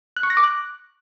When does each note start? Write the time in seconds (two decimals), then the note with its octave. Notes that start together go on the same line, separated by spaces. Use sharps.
0.16 F#6
0.23 C#6
0.30 A#6
0.37 D6
0.44 F#6